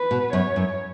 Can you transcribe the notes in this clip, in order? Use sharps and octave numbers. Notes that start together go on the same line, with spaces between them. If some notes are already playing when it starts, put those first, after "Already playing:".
Already playing: B4
B2
F#2 C#5
F#2